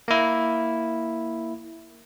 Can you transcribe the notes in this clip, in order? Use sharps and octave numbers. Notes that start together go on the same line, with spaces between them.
A#3 E4